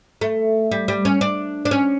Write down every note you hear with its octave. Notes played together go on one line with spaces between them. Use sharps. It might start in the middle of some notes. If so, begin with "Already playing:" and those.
A3
G3
G3
C#4
D4
D4
C#4